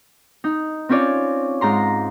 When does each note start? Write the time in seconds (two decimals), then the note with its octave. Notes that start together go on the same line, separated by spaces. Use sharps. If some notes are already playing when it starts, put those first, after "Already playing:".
0.44 D#4
0.89 C4 C#4 F4 C#5 D5
1.61 G#2 F4 A#5 C6